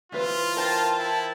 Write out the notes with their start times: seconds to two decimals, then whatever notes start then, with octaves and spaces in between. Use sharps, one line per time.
0.12 E3 F4 B4 C5
0.57 A#4 C5 G5 A5
0.99 E4